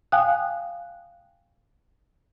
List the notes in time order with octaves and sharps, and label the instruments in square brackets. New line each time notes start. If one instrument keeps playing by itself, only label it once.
[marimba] F5 G5 G#5 D#6 F#6